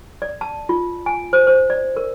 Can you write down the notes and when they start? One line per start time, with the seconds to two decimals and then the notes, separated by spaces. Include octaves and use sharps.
0.22 D5
0.41 A5
0.69 F4
1.06 G#5
1.33 C5
1.47 C5
1.70 D5
1.97 A#4